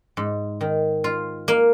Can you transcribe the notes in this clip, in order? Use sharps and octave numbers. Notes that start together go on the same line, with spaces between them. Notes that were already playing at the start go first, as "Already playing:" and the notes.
G#2
D#3
F4
A#3